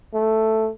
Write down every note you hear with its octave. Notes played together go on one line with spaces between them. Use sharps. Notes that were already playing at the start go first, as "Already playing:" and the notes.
A3